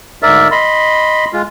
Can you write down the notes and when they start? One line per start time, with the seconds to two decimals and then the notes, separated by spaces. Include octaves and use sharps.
0.23 D2 G#2 A#4 D5 E5
0.51 D#5 B5 C6
1.33 G#3 F4